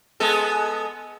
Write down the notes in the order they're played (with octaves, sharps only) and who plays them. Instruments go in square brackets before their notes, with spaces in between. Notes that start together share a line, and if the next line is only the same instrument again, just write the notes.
[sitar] G#3 B3 A4